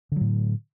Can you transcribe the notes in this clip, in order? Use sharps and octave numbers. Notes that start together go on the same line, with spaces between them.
A2 D3 F#3